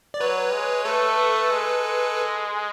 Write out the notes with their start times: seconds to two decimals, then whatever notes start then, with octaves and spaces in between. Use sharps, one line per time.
0.14 D5
0.20 F#3 B4 C#5
0.53 G#3
0.85 A3 A4 B4
1.51 G#3